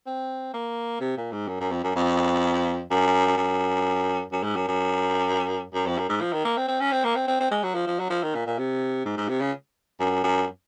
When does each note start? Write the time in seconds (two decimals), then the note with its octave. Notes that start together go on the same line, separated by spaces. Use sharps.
0.06 C4
0.54 A#3
1.00 C3
1.17 A#2
1.32 G#2
1.48 F#2
1.60 F#2
1.71 F2
1.84 F#2
1.96 F2
2.91 F#2
3.37 F#2
4.32 F#2
4.43 G#2
4.56 F#2
4.68 F#2
5.74 F#2
5.86 F2
5.98 F#2
6.09 G#2
6.21 F3
6.33 D#3
6.45 A#3
6.57 C4
6.68 C4
6.80 C#4
6.92 C4
7.04 A#3
7.16 C4
7.27 C4
7.40 C4
7.51 G#3
7.63 F#3
7.74 F3
7.87 F3
7.99 F#3
8.10 F3
8.23 D#3
8.35 A#2
8.46 A#2
8.58 C3
9.05 G#2
9.17 G#2
9.29 C3
9.41 C#3
10.00 F#2
10.24 F#2